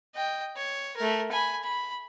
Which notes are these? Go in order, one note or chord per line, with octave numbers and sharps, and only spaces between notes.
D#5 G5
C#5
A3 A#4
G#5 B5
B5